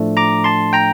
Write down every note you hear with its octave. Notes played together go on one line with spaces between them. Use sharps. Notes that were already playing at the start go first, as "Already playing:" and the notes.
Already playing: A2 F3 A3 D4
A#5 D6
A5 C6
G5 A#5